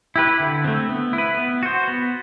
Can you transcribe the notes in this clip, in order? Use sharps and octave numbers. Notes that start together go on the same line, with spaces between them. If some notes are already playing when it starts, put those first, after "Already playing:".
E4 G4 B4
D3
A3 C4
B3
E4
B4
B3
F#4 C5
B3